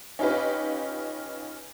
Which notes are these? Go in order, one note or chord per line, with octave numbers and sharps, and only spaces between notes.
C#4 D#4 F4 G4 B4